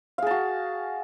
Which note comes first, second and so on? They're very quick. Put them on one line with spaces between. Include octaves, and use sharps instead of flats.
F5 G#4 A5 F#4